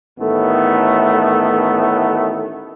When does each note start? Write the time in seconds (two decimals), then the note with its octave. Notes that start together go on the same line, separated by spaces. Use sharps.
0.18 A1 A2 D#3 A3 B3